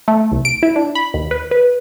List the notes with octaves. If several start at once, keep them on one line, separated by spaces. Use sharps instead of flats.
A3
C2
D7
E4
D4
B5
D#2
B4
B4